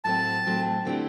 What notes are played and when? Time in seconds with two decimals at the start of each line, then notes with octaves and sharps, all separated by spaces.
0.04 A2 F#3 A3 C4 A5
0.45 A2 F#3 A3 C4
0.85 D3 A3 C4 E4 G4